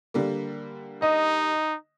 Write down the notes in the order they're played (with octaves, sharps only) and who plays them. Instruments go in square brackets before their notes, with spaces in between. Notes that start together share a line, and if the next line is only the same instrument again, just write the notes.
[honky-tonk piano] D3 G3 A#3
[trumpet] D#4 [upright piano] D#5